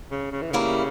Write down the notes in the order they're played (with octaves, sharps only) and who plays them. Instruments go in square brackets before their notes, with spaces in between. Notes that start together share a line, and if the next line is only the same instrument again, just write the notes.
[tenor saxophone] C#3
C#3
E3
[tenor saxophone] C#3 [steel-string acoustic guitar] G3 A#3 E4